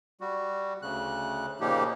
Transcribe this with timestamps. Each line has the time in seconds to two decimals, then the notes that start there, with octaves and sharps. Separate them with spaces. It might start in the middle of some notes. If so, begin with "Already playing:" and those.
0.21 G3 F#4
0.82 D2 C#3 F#6
1.60 A#2 C#3 F3 A#3 D#4 G4